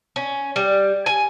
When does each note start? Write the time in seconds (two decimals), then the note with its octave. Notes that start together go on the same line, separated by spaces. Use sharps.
0.16 C#4
0.56 G3
1.06 G#5